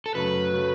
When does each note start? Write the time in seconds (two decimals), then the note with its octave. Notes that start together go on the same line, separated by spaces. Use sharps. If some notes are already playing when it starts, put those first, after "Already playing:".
0.06 A4
0.15 F#2 C#3 F#3 A3 B4
0.53 C#3 F#3 A3